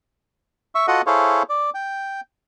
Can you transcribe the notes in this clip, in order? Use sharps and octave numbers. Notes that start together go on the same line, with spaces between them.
E5 C#6
F4 F#4 A4 D#5 F#5
E4 G#4 A4 C5 C#5 F5
D5
G5